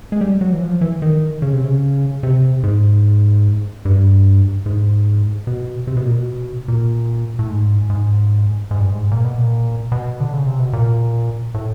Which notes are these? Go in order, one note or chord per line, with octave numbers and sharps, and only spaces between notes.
G#3
G3
F#3
E3
F3
E3
D#3
C#3
C3
C#3
C3
G#2
G2
G#2
B2
C3
B2
A#2
B2
A#2
A2
G#2
G#2
G#2
G2
G#2
A#2
B2
A#2
B2
D3
C#3
C3
B2
A#2
A2